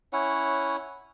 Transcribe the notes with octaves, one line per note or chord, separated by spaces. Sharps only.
C#4 E4 C#5 F#5